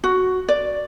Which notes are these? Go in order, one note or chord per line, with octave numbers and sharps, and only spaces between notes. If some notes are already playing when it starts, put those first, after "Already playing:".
F#4
D5